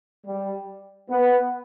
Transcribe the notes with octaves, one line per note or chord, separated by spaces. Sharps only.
G3
B3